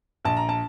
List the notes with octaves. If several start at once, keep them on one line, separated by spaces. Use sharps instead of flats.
A#1 A5
A#5
A5